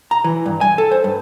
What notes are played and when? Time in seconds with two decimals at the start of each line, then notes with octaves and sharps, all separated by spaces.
0.11 A#5
0.24 E3
0.46 G2
0.61 G#5
0.78 A4
0.91 C5
1.04 G2